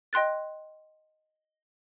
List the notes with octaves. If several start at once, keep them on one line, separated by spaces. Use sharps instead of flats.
D#5 G5 C6 F#6 A6